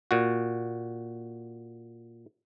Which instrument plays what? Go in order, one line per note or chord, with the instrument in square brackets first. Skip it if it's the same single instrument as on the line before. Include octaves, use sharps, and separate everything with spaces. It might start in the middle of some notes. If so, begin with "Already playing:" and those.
[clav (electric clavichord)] A#2 F#4